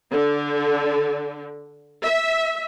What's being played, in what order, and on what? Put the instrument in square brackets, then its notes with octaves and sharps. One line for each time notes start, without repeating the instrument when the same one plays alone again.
[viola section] D3
E5